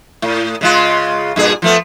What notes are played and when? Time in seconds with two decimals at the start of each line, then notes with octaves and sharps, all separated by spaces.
0.22 A2
0.61 C#3 G#3 F4
1.36 G2 A#2 G#4
1.62 F3 A3 B3